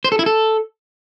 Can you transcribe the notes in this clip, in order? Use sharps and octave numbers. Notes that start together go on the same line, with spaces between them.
C5
A4
E4
A4